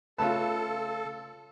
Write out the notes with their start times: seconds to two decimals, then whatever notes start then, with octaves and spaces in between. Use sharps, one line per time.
0.18 C#3 A3 F4 A4 B4 A5